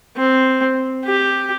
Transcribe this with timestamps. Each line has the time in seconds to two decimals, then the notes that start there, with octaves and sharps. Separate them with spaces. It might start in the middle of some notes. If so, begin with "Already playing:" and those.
0.17 C4
1.05 G4